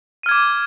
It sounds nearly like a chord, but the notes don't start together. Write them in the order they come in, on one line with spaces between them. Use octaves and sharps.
D#7 F6 G#6 D6